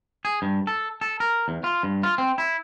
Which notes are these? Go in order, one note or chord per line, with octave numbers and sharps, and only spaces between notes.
G#4
G2
A4
A4
A#4
E2
F4
G2
F4
C4
E4